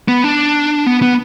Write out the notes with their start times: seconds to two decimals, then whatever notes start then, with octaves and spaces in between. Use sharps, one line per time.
0.08 B3
0.24 D4
0.86 B3
1.02 B3